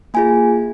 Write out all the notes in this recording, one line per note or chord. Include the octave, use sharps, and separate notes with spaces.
A#3 F4 G#4 G#5